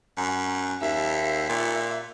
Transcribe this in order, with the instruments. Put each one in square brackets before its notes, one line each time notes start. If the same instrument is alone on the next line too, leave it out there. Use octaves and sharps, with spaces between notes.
[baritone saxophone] F#2
[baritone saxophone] D#2 [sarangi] E5
[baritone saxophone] A#2